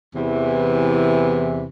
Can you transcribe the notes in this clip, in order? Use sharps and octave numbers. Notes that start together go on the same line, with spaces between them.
E2 C3 E3